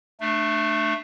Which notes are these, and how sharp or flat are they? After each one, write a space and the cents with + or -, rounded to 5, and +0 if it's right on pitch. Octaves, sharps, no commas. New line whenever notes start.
A3 +0 D4 +30